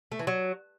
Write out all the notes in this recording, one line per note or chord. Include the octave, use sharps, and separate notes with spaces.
A3
E3
F#3